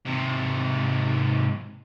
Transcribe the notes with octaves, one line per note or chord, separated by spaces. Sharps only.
G#2 C3